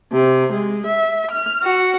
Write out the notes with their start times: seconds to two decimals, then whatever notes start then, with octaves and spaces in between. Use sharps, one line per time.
0.12 C3
0.52 G#3
0.86 E5
1.30 F6
1.62 F#4